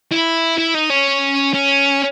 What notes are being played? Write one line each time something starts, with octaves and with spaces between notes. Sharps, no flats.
E4
E4
D#4
C#4
C#4